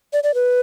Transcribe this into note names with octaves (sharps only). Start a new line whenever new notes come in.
D5
D5
B4